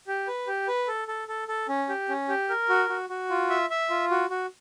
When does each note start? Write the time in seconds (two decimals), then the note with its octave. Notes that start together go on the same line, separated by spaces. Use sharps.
0.07 G4
0.27 B4
0.47 G4
0.68 B4
0.88 A4
1.08 A4
1.28 A4
1.48 A4
1.69 C#4
1.89 G4
2.09 C#4
2.28 G4
2.49 A#4
2.69 F#4
2.89 F#4
3.09 F#4
3.30 F4
3.50 E5
3.70 E5
3.90 F4
4.11 F#4
4.30 F#4